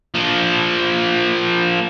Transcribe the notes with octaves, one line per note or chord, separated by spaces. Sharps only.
F3 A#3